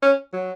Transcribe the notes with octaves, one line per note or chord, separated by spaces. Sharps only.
C#4
F#3